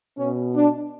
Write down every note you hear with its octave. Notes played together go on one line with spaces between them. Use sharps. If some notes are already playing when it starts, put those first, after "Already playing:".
B2 C#4
D4